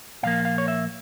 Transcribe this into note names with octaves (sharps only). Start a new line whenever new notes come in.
A#2 F3 A#3 F5
F5
C#5
E5